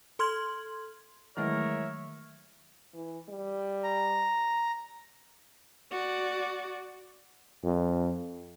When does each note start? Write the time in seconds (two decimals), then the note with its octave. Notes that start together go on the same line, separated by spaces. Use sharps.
0.19 A4 C6 F6 G#6 F#7
1.37 D#3 E3 F#3 G#3 A3 A#4 C#5 E5
2.94 E3
3.29 G3
3.84 A#5
5.91 F#4 D5
7.63 F2